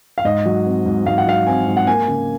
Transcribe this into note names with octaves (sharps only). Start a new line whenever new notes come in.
F5
G#2 D#5
F#3
C4
G#2
G#2 F5
F#5
F#3 F5
C4 G#5
G#2
F#5
A#3 G#5
C#3